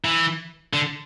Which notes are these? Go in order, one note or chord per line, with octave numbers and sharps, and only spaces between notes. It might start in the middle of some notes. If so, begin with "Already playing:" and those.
E3
D3